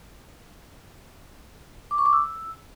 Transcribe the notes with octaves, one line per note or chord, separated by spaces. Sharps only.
D6
C#6
D6
E6